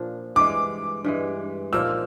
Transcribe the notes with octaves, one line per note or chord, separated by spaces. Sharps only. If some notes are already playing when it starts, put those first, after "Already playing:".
Already playing: A#2 F3 A#3 D4
G2 E3 G#3 D6
G2 E3 G#3
A#2 F3 A#3 D#4 E6